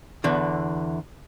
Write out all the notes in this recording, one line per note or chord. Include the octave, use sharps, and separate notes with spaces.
E2 D3 E3